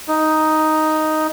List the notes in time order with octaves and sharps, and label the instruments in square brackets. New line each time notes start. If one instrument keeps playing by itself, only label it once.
[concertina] D#4